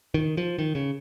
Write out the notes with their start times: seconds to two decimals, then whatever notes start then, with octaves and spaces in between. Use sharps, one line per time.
0.14 D#3
0.37 F3
0.58 D#3
0.75 C#3